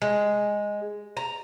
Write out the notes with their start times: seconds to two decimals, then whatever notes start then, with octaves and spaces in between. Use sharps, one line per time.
0.02 G#3
1.17 A#5